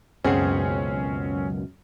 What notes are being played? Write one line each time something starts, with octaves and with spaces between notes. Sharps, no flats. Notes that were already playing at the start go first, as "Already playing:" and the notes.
C#2 F#2 B2 C4 C#4 G#4 F#5